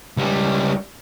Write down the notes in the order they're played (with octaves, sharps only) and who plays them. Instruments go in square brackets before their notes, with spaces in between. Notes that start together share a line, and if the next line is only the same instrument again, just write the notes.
[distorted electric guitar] C#2 G3